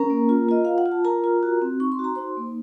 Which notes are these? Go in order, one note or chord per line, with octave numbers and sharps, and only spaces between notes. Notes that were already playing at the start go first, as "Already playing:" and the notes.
Already playing: C#4 A#4 A#5
A#3
F4
F4 D#5
F4 F5
F#5
F4
A5
F4 A#4 A#5
F4
F#4
C4
D#4 C#6
C6
F#4
A#5
D#4 C5 C6
A#3